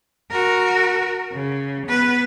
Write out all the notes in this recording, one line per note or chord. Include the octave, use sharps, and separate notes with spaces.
F#4 A#4
C#3
B3 B4